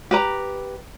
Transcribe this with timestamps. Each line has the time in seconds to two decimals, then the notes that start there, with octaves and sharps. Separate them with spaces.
0.11 G4 B4 A#5